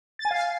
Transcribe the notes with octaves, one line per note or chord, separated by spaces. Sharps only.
A6
G#5
F5